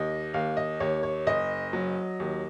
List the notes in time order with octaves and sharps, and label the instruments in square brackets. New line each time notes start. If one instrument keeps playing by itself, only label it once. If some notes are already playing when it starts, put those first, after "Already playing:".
Already playing: [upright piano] D#2 D#5
D#2 F5
D#5
D#2 C#5
C#5
F#1 D#5
F#3
D#2